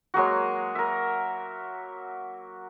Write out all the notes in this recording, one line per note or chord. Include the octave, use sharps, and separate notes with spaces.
F#3 G#3 A#3 F#4
A#4 E5